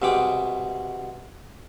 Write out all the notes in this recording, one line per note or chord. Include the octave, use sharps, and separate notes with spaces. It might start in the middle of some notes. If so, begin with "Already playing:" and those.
C2 B2 G#3 G5 D6